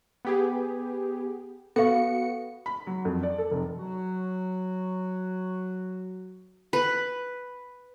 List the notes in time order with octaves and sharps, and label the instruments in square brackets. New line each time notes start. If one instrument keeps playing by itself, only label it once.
[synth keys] B3 G4 G#4
[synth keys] B3 F#4 C#7 [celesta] A4 F5
[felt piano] B5
F#3
F2
D5
A4
F1
[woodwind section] F#3 F#4
[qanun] B4